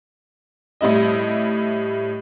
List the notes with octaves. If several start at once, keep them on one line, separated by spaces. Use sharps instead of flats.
A2 G3 E4 D#5